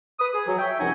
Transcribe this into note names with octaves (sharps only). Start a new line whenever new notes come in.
B4 D#6
G#4
F#3
C#5 E5 G5
C2 F#2 F3 D#4 F#5 G#5